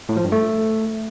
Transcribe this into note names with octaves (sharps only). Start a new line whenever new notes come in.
A2
F3
G2
A3